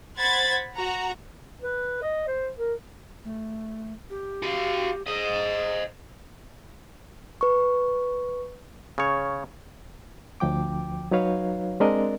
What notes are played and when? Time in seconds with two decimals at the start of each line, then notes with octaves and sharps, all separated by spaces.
0.17 C5 F#5 B5 G#6 A6
0.74 F#4 A#5
1.62 B4
2.02 D#5
2.27 C5
2.57 A#4
3.24 A3
4.10 G4
4.43 F#4 F5
5.07 G#4 C5 D#5
7.41 B4 C#6
8.98 C#3 C#5
10.40 D2 F3 G5 D6
11.11 F#3 D#4 F#4 B4 C#5 F5
11.80 G#3 C4 D4 A#4 D5 D#5